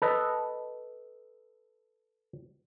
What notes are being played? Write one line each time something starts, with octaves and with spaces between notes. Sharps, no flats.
A4 B4 D#5